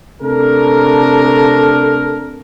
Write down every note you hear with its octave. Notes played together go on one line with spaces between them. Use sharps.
C3 A3 D4 A4 A#4